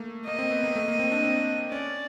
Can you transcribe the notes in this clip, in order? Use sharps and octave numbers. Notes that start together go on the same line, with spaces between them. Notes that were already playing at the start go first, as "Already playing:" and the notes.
Already playing: A3 A#3
A#3 D#5
C4
B3
A#3
A3
A#3
C4
D4
C4
C#4 D5